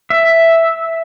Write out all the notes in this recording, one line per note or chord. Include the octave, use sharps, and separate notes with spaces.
E5